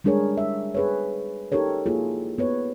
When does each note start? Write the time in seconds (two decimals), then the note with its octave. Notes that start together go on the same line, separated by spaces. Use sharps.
0.04 G3 G#3 D4 G#4 A#4 C#5
0.38 E5
0.75 G#4 B4 C#5
1.52 D#4 G4 A4 A#4 C#5
1.86 A#3 E4 F4 G#4
2.38 B3 B4 C#5